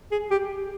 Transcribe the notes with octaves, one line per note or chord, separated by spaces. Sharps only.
G#4
G4